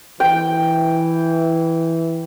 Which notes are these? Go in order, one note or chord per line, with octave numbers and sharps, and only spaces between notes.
E3 G5